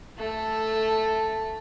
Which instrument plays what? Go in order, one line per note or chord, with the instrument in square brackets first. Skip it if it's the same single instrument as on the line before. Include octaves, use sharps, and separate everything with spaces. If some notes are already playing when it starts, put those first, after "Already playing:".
[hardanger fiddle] A3 A4